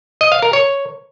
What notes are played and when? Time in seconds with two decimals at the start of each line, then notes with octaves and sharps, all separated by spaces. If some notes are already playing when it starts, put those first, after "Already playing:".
0.21 D#5
0.32 F5
0.42 A#4
0.53 C#5